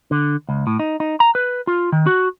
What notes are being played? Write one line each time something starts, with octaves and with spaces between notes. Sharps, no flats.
D3
C#2
A2
D#4
D#4
A#5
B4
F4
D#3
F#4